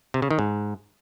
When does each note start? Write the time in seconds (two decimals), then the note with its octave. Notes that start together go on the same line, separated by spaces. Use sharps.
0.14 C3
0.22 C#3
0.31 D#3
0.39 G#2